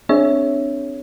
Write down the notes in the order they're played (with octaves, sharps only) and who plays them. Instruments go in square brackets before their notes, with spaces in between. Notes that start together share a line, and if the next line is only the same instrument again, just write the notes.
[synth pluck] C4 D4 G#4 C#5 E5